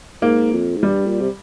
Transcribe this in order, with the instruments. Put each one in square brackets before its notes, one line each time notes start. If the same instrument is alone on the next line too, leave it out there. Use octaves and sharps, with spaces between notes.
[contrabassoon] G#2 [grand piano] A#3
[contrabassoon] F2
G#2
[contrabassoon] G2 [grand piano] G3
[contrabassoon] A#2
C3